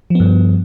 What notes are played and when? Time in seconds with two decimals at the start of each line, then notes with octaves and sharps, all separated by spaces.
0.10 F3
0.15 B3
0.20 G2